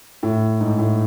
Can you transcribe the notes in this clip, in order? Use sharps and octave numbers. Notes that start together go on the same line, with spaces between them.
A2
G#2
A2